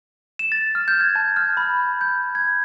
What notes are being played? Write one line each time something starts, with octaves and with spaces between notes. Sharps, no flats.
E7
A6
F6
G6
G#6
A5
F6
B5
G6
G#6